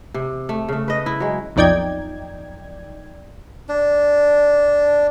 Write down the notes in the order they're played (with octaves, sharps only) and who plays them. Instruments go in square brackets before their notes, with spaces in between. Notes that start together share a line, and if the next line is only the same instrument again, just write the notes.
[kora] C3
A3
C#3 A3
B4 D#5
E4
F#3 G#3
[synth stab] B1 F2 D#4 D5 G5 G#6
[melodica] D4